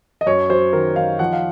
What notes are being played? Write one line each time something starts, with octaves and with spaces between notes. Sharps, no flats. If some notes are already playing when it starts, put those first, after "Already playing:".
D#5
F#2 C#5
F#3 C5
D#3 A#4
D#3 F5
F3 F#5
F5